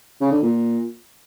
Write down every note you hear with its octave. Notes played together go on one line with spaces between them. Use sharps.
C#3
D3
A#2